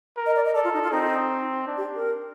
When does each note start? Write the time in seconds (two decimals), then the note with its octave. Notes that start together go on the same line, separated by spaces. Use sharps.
0.17 A#4
0.26 D#5
0.36 D5
0.45 D#5
0.54 A4 D5
0.64 F4
0.74 D#4
0.83 F4
0.91 C4 D#4
1.67 D4
1.77 G4
1.95 A#4